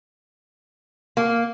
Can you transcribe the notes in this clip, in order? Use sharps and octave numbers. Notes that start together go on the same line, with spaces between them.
A#3